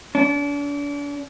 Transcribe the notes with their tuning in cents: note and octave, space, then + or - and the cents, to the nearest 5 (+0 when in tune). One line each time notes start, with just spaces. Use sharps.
D4 -40